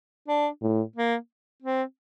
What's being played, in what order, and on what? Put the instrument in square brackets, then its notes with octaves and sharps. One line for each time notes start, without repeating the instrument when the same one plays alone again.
[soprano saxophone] D4
[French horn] A2
[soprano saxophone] A#3
C4